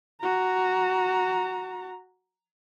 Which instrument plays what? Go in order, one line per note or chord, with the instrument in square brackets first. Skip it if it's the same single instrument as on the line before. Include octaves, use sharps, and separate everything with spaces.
[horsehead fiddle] F#4 A#5